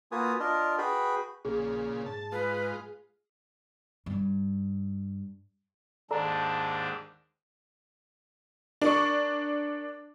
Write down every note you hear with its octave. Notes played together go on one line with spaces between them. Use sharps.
A#3 F4 F#4 B4 G#5 D#6
D4 F4 A#4 D5 D#5
F#4 G#4 B4 G5 B5
A#1 A#2 C#3 G#4
G#2 A5
G#3 F4 B4
G2
D#2 G#2 D4 A4 D5 A5 A#5
D4 A#4 C#6